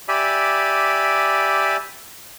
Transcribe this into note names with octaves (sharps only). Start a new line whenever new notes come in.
G4 D5 E5 G#5 B5